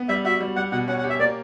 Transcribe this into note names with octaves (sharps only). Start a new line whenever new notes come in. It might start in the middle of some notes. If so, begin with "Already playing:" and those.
Already playing: B3
G3 E5
F#4 E5
G3
G3 F#5
B2 F#5
C#4 F#5
F#5
G4
E5
A#3 D5